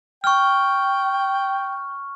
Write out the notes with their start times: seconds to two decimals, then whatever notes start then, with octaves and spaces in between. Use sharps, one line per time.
0.24 G5 C#6 F6